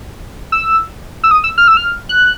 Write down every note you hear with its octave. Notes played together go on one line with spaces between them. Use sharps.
E6
E6
D#6
E6
F6
E6
F6
F#6